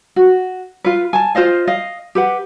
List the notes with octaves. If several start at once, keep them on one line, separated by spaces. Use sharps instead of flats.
F#4
F4 B4
G#5 A5
F4 C5 D#5 F5
D#5 F5
G4 B4 F#5